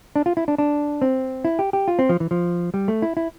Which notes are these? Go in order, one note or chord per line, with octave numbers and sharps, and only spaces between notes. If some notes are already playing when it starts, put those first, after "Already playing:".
D4
F4
E4
D4
D4
C4
E4
G4
G4
F4
C4
F3
E3
F3
G3
A3
E4
E4